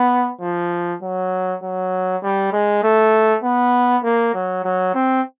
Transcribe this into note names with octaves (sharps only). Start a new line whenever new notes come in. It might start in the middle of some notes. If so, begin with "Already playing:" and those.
Already playing: B3
F3
F#3
F#3
G3
G#3
A3
B3
A#3
F#3
F#3
C4